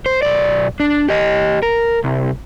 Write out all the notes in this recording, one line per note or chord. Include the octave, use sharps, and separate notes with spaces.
C5
B1 D5
D4
G4 D#5
A#4
C2